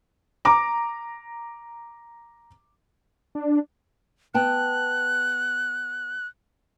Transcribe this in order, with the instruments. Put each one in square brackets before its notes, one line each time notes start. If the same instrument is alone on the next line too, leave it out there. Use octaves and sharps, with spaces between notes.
[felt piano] A#5 D6
[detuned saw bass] D4
[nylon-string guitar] B3 G5 A5 [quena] F#6